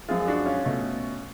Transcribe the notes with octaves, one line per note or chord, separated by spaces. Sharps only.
F#2 F3 G#3 F4 G#4
D4 F#4
C#4 F4
B2 A3